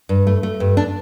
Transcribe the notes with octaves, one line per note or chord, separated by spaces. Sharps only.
G2
A3
A3
G2
D4